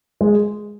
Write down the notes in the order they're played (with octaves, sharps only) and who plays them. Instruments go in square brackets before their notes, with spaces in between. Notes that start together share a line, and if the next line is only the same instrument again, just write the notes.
[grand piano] G#3